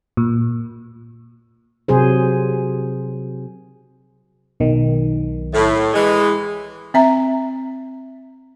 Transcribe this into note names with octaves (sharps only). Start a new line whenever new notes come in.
A#2
C3 F#3 G#4 C5
B1 D#3
A2
E3 G#3
C4 E5 A#5